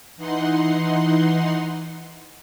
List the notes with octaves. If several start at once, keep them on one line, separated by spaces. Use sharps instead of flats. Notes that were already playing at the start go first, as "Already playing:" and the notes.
E3 D#4 F#5 C6